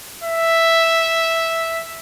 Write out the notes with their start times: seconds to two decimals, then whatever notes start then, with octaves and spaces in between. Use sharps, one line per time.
0.24 E5